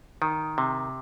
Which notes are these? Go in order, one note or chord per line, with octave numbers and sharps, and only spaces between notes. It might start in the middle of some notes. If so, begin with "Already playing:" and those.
D#3
C3